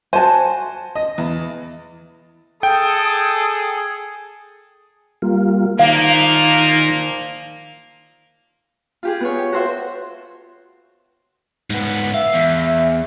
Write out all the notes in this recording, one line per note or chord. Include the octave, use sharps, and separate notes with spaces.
F#4 C5 G#5 A5
D#5
E2
G#4 A4 G5 D#6
G3 A#3 F4
A#2 D#3 F3 A#3 F5
F4 G4 G#4
B3 G4 C#5
G4
F#4 A4 C5 E5
G#2 B3
E5 F5
E2